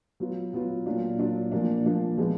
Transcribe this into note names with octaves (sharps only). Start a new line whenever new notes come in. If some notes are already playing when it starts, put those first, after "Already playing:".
F#3 B3 F4
F#3 B3 F4
A#2 F#3 D4 F4
A#2 F#3 D4 F4
A#2 F3 A#3 D4
A#2 F3 A#3 D4
F3 G#3 B3